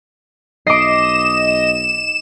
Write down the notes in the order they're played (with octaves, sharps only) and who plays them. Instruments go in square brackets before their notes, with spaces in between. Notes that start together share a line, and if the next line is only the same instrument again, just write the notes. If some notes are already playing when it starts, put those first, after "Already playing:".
[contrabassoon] B1 [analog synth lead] D#5 [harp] D6 C7 [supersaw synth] E7